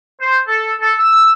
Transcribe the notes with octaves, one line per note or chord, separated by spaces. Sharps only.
C5
A4
A4
E6